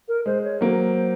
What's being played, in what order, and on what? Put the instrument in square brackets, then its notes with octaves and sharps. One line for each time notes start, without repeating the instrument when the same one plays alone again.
[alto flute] A#4
[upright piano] G#3 [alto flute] C5
[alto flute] C#5
[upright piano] F#3 A#3 [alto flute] C5